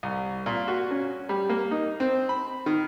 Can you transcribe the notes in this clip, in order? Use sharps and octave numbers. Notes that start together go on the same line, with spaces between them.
C2
A#2
F#4
C#4
G3
A#3
D#4
C4
B5
D#3